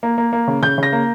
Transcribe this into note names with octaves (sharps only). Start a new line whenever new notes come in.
A#3
A#3
A#3
C#3
C#3 G6
C#3 A#6
A#3